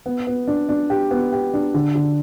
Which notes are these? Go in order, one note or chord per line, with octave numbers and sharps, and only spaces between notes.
B3
B3
D4
D4
G4
B3
G4
D4
D3
D3